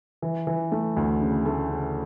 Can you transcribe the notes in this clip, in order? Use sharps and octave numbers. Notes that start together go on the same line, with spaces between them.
E3
E3
A3
D2
C#3
A3
C#3